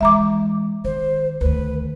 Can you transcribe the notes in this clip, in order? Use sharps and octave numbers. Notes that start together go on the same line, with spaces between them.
E3 G#3 E5 A#5 D6
D#3 C5
D2 D#3 B4